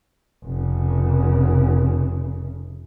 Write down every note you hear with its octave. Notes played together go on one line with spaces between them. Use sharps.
F1 C#3